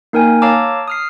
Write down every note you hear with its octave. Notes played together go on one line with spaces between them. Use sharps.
A#3 D#4 A#4 G5 G#5
C#5 F5 A5 A#5 D6 E6
D#6 F6 C7